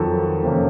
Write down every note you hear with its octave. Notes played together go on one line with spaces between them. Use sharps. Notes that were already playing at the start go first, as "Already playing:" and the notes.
Already playing: F2 D#3 F#3 A4
F2 C3 F3 A#3 C#4